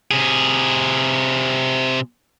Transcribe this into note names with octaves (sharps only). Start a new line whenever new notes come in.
C3 G#4